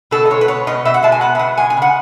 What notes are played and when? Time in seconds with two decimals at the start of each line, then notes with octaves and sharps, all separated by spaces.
0.11 B2 A4
0.26 D#5
0.30 G#3 C#5
0.41 B4
0.48 B3 C#5
0.67 B2 D#5
0.85 B2 E5
0.94 F#5
1.03 G#3 A5
1.12 G#5
1.21 B3 F#5
1.35 E5
1.39 B2 F#5
1.57 G#3 G#5
1.70 G#5
1.77 C#3 F#5